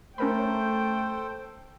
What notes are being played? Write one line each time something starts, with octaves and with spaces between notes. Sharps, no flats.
A3 C#4 A4 A#4 C5 G5 B5